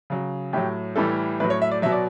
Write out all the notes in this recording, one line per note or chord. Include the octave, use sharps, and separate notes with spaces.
C#3 F#3
A2 F#3 G4
A2 E3 G3 A4
A2 F#3 B4
C#5
E5
D5
B2 F#3 E5
D5